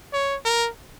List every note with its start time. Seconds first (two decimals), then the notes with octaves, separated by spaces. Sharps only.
0.13 C#5
0.45 A#4